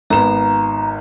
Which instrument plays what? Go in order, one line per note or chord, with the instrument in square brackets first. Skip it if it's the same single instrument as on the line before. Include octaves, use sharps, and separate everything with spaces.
[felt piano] G#1 B3 E7 [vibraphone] A#5